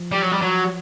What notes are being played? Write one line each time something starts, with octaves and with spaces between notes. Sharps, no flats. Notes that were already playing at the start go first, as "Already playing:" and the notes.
Already playing: F3
G3
F#3
G3
F#3